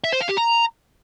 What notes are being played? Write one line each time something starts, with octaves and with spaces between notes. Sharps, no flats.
E5
C5
F5
G4
A#5